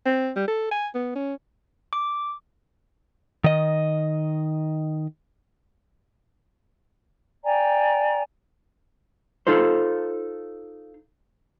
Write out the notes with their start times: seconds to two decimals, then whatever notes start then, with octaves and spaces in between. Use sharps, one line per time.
0.06 C4
0.36 G3
0.47 A4
0.71 G#5
0.94 B3
1.15 C#4
1.93 D6
3.44 D#3 D#5
7.44 D5 G5 G#5 A#5
9.47 D#4 F4 A4 C5